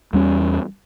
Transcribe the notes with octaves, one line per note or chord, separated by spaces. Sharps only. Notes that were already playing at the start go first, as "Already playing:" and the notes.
E2 G3 C#4